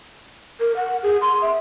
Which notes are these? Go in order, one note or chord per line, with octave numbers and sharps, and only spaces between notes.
A#4
F#5
G#4
C6
E5